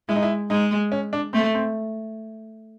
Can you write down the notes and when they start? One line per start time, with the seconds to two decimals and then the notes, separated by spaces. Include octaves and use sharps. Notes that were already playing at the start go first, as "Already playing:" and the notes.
0.09 G#3 E4
0.16 D#4
0.22 E4
0.50 G#3 D#4
0.92 C#4
1.13 D4
1.33 A3 C4
1.55 C4